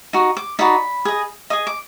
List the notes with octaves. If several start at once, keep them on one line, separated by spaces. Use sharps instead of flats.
D#4 F#4
D6
D#4 F#4 D5 B5
G#4 D#5
G#4 D#5 D#6
D6